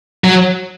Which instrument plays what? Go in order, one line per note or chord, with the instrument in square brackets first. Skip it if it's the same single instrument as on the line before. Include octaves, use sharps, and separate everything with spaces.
[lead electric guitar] F#3